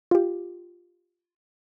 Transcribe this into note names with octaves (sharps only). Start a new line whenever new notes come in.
F4 G4